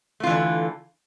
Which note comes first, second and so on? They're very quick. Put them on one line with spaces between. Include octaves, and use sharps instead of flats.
A3 F4 E3 D3